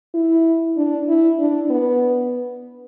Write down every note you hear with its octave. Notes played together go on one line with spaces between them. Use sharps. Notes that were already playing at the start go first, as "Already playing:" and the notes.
E4
D4
E4
D4
B3